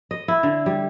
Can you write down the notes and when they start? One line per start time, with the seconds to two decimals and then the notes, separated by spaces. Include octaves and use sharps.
0.11 D#5
0.28 E4
0.43 D3
0.66 G3